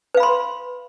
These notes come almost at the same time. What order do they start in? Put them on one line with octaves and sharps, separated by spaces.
B4 F5 B5 C6